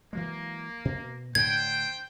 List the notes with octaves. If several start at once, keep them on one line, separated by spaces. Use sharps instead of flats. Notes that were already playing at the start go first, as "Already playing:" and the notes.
E3 F#3 G#3 A#3
B2
A2 D3 A3 C5 G5 G#6